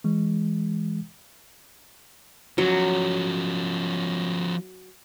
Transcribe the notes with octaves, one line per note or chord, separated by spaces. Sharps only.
E3 G#3
F3 F#3 C#4